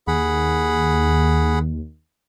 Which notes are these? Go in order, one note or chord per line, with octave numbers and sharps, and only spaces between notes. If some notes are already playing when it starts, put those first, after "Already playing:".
D#2 G#4 F#5 B5